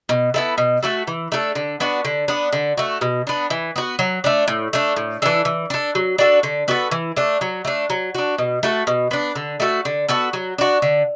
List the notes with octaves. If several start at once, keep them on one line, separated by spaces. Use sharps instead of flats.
B2
B3 E4 A4
B2
A3 F#4 A4
E3
A3 D4 A4
D3
B3 D4 F#4
D3
B3 D4
D3
A3 F#4
B2
B3 D4
E3
B3 F#4
F#3
A3 D4
A2
A3 D4
A2
E3 D4 A4
E3
D4 A4
F#3
D4 F#4 A4
D3
B3 F#4 A4
E3
A3 D4
F#3
A3 D4
F#3
D4 F#4
B2
A3 F#4 A4
B2
B3 D4
D3
A3 F#4 A4
D3
B3 F#4 A4
F#3
D4 F#4
D3